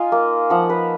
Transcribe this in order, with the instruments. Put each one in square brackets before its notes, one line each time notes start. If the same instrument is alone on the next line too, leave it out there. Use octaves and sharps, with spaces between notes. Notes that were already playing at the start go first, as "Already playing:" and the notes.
Already playing: [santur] D#4 F4 G#5
A#3
F3 F#5
B4